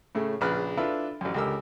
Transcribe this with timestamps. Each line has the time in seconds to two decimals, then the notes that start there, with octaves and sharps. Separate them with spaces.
0.15 A2 C#3 A3
0.41 A#1 C#3 B4 F6 F#6
0.77 D4 E4 F4 A4 B4
1.21 A1 F#2
1.34 C#2 D3 G4 A#4 E6